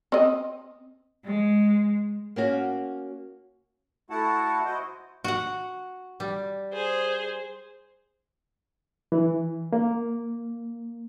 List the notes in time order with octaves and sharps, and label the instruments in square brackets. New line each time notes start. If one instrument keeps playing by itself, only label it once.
[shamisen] C4 D#5
[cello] G#3
[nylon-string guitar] A#3 C#4 F#4
[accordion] A3 E4 F#4 F#5 A5
E4 F#4 C5 D#5
[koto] F#4 F#5
G3
[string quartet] G#4 C5
[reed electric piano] E3
A#3